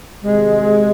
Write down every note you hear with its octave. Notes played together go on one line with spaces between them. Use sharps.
C3 D#3 G#3